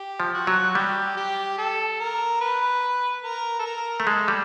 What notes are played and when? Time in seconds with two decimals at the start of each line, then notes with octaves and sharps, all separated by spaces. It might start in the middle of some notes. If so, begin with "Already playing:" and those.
Already playing: G4
0.20 F3
0.34 F#4
0.47 F#3
0.75 G3 G4
1.17 G4
1.58 A4
2.00 A#4
2.41 B4
3.24 A#4
3.59 A4
3.66 A#4
4.00 A3
4.07 G#3 A4
4.28 G3